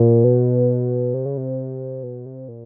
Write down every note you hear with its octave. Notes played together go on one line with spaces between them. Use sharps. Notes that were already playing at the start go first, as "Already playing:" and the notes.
Already playing: A#2
B2
C3
C#3
C3
B2
C3
A#2